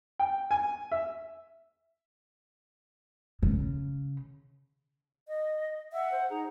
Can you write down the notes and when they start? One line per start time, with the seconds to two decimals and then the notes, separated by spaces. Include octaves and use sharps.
0.19 G5
0.51 G#5
0.92 E5
3.43 C#3
5.28 D#5
5.92 E5 F#5
6.12 C5
6.30 D#4 G#4 C5 A#5